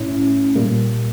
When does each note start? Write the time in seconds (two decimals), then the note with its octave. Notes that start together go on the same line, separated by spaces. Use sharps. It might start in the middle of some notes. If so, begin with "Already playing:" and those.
Already playing: A2 C#4 E4
0.55 A#2 G3 A#3